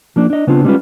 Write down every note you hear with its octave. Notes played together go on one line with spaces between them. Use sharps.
F3 A#3 D4
D4 D#5
C#3 B3 C4 D4 F4
G3 G#3 B3 C#4 F4 B4